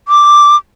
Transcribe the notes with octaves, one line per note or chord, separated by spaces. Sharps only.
D6